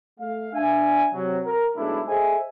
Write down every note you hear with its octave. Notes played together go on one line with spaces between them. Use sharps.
A3 F5
D4 E5 G#5
C3 F#3
A#4
B1 G#3 A3 D4 E4
G#4 A4 C5 D#5 E5 G#5